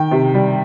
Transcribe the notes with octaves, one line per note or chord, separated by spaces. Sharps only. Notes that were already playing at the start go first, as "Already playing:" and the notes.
Already playing: D#3 G5
C3
G3